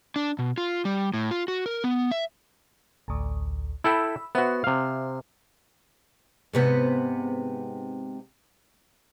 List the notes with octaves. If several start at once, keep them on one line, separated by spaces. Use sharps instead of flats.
D4
B2
F4
G3
A2
F4
F#4
A#4
B3
E5
A1 D2
E4 A4 G5 B5 E6
B3 F#4 C5 E5
C3 F5
G#2 C3 B3